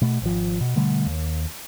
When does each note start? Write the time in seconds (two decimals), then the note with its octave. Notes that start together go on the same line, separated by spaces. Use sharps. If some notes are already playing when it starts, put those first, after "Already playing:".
0.01 B2 A3
0.22 G#1 F3
0.61 B2
0.76 B2 D3 G3 A3
1.06 D#2